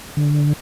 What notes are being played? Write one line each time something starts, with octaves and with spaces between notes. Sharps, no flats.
D3